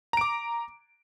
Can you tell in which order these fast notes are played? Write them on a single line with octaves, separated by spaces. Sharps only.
A#5 D7 D6